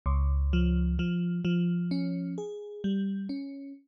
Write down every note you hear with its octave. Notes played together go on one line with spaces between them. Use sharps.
C#2
F3
F3
F3
C#4
G#4
G3
C#4